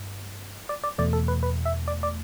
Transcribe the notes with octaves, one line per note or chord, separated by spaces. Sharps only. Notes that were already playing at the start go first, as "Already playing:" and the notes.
Already playing: G2
D5
D5
E2 B2 A3 D5
A4
B4
B4
E5
D5
D5